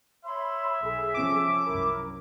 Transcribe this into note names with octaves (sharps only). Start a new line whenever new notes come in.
C#5 E5 B5 C6
B1 G#4 A4
C3 F3 C#4 D6
C2 F#2 E4 A#4